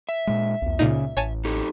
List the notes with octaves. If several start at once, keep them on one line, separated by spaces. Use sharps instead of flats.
E5
A#2 G#3
B1 E2
C#2 A#2 C#3 C#4 D#4
A1 C#5 G#5 A5
D#4 G4 A4